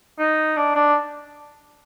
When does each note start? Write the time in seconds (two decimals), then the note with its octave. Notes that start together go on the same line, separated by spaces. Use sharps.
0.19 D#4
0.56 D4
0.75 D4